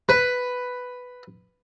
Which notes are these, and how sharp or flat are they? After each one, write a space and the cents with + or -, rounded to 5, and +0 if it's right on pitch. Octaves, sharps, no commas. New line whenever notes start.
B4 +5